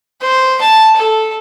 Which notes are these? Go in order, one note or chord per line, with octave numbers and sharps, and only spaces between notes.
C5
A5
A4